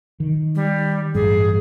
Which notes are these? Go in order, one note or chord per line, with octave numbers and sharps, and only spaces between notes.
D#3
G3
A1 G2 G3 G#4